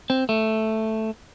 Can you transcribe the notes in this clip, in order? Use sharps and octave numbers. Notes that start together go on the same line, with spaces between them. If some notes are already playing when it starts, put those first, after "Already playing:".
C4
A3